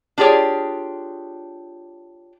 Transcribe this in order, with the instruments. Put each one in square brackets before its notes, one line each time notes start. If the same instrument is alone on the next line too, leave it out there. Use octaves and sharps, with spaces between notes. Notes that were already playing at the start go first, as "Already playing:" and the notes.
[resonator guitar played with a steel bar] D4 F4 G4 G#4 C#5